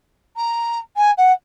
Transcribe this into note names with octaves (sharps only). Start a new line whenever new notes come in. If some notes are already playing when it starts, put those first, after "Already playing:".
A#5
G#5
F#5